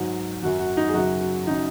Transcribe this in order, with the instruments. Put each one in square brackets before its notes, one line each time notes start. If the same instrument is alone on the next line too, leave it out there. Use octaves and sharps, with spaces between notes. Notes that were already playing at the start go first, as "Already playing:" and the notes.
Already playing: [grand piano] G#2 F#3
F#2 F#3 F#4
F#4
D#4
G#4
F#2 C#3 F#3 F#4
F#4
C#3 F#3 D#4